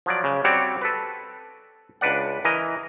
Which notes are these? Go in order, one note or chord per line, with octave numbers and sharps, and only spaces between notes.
F3 F#3 D5
C#3
G3 C4 F#4 C#5 D5
A4 B4
C#2 D4 B4 D5 F#5
E3 A#4 D#5